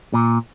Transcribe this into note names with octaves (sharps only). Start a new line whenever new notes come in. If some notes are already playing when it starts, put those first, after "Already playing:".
A#2